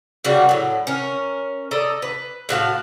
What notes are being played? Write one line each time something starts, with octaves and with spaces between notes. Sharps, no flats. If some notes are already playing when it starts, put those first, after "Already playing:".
C#3 G3 A#3 F#4
A2 F#3
C#4 A#4
A4 D5 D#5 A#5
B4
A2 F#4 F5 A5